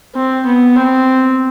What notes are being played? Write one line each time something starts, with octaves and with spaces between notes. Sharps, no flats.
C4
B3
C4